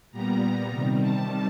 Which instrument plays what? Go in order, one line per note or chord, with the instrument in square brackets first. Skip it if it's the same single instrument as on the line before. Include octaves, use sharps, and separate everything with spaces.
[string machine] A#2 G3 B3 A#5
C3 D#3 G3
A5